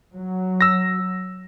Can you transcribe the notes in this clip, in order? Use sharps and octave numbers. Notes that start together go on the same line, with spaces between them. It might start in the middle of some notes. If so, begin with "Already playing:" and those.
F#3
E6 A#6